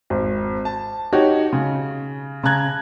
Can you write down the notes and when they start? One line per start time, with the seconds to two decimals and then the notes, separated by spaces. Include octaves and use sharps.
0.10 G#1
0.65 A5
1.13 D#4 F#4 G4 C#5
1.53 C#3
2.43 C#3 A5 A#5 F#6 G#6